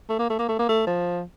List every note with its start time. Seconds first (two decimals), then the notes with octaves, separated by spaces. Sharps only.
0.10 A3
0.19 A#3
0.30 A3
0.39 A#3
0.49 A3
0.59 A#3
0.69 A3
0.87 F3